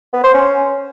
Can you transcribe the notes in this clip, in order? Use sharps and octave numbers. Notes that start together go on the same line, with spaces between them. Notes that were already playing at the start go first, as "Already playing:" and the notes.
B3
C5
C#4